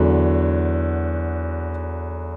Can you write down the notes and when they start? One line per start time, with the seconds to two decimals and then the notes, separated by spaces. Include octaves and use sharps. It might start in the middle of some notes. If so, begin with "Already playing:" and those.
Already playing: E2 D3 F#3